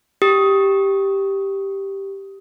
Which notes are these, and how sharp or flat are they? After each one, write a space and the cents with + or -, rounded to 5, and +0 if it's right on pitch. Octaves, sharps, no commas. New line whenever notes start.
G4 +0 D#6 +15